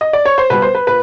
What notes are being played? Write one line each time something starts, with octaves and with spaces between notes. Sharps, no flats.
D#5
D5
C#5
C5
B2 G3 B4
C5
B4
A#2 B4